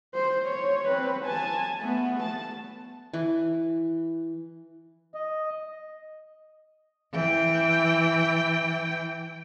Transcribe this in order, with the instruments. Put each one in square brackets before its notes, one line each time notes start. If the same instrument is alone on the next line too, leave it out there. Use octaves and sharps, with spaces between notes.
[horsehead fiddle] C5
C#5
C4 B4
G#5 A5
A3 B3
A5
[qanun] E3
[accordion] D#5
[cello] E3 G5